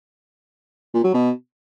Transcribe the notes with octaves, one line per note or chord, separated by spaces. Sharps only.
A#2
F#3
B2